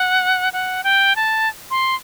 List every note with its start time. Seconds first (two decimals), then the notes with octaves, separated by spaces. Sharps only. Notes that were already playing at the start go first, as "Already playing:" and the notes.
Already playing: F#5
0.53 F#5
0.84 G5
1.16 A5
1.71 C6